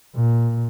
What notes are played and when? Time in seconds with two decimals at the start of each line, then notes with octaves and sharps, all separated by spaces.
0.15 A#2